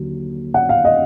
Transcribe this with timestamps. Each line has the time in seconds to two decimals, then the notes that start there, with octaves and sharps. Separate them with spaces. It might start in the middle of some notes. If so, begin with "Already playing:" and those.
Already playing: D#2 D3 F#3
0.54 F#5
0.69 F5
0.85 D#5